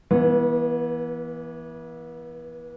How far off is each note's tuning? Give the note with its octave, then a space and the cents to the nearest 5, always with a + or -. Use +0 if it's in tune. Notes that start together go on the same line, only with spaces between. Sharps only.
E3 +0 B3 -35